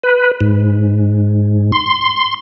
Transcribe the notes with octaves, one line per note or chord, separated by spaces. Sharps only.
B4
G#2
C6